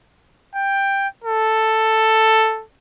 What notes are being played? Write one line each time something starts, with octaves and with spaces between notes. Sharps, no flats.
G5
A4